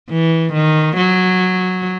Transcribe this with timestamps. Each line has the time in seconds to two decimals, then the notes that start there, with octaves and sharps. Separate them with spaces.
0.10 E3
0.53 D#3
0.97 F#3